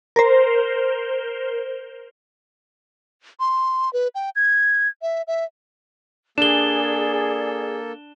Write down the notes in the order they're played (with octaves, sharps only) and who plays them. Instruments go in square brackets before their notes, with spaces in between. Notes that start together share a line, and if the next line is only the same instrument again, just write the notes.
[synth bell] A#4 C5
[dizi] C6
B4
G5
G#6
E5
E5
[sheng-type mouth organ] A#3 A4 [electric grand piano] D4 [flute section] G#4 D5 [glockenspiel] E7 G7